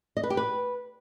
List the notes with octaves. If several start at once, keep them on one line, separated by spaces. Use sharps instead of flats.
D#5
B4
G4
B4